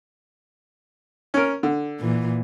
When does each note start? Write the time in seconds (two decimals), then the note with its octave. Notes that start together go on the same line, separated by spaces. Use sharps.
1.34 C#4 A#4
1.63 D3
2.00 A#2 E3